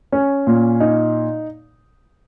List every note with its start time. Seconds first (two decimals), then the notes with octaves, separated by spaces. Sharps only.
0.12 C#4
0.47 A#2
0.80 D#4